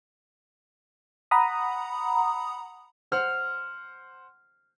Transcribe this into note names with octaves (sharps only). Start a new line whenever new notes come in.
F#5 A#5 B5 D#6
C5 F#5 F6